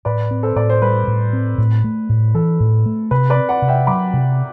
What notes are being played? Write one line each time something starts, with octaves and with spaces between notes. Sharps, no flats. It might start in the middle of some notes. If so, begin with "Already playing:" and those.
A2 B4 D5
C4
A4 C5
A2 D5
C5
G3 B4
A2
C4
A2
A3
A2
E3 A4
A2
A3
C3 B4
B4 D5
C4
D5 F#5
C3
E5 G5
F#3 B5 D6
C3